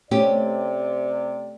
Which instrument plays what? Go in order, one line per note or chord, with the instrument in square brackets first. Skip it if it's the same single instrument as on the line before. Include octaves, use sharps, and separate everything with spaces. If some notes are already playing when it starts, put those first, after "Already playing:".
[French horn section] C3 D5 [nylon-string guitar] A3 C#4 G4